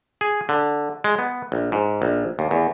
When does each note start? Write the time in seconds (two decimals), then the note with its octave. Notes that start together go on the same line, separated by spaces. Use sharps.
0.21 G#4
0.49 D3
1.04 G#3
1.19 B3
1.52 A#1
1.72 G#2
2.02 A#1
2.39 D#2
2.51 E2